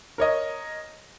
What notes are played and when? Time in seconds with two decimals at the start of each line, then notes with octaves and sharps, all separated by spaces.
0.18 A#4 C#5 D#5